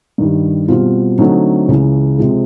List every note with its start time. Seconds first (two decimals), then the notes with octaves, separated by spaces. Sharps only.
0.18 G2 D#3 G3
0.68 B2 G3 C4 F4
1.18 D3 F#3 A3 C4 D#4
1.68 C#2 C#3 E3
2.18 C3 F3 G#3